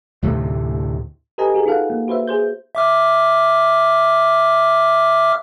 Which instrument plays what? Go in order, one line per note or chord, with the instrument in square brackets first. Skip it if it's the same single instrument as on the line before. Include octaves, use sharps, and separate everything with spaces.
[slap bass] D2 A2 C3 A3
[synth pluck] G4 A4 B4 D#5 G#5 A#5
F#4 G#4 A#4
D#4 F4 A4 F5 F#5
A#3
F#4 B4 C5 E5
G#4 C5 G6
[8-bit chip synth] E5 D6 F6